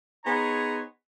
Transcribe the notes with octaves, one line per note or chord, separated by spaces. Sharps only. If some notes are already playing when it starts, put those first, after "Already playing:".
B3 D#4 G#4 C5 C#5 A#5